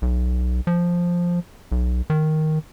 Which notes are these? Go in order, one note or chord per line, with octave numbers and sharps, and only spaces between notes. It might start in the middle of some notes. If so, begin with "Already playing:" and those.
B1
F3
B1
D#3